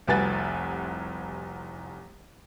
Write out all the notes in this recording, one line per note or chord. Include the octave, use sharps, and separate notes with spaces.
F1 C2 F#4 B4 G#5 A6